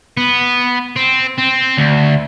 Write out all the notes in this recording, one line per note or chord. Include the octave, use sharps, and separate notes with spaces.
B3
C4
C4
D2